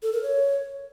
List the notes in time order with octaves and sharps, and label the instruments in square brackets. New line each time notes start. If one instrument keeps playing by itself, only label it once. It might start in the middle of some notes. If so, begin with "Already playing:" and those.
[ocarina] A4
A#4
C#5